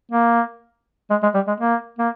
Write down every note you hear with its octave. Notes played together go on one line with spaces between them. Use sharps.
A#3
G#3
G#3
G3
G#3
A#3
A#3